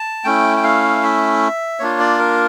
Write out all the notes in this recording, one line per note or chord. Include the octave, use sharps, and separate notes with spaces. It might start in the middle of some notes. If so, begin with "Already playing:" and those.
Already playing: A5
A3 C#4 E4 G5
G5
F5
E5
A#3 D4 F4 C#5
D5
A#4